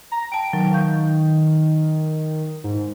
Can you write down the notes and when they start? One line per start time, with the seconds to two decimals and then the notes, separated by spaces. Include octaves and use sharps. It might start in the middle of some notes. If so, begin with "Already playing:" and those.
0.12 A#5
0.32 G5 A5 D7
0.53 D#3 F#3
0.73 F5 C#6 G6
2.64 G#2